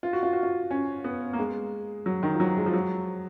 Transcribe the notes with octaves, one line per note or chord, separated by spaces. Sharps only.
F4
F#4
F4
F#4
F4
C#4
B3
A#3
G#3
F#3
D#3
F3
F#3
G#3
F3
F#3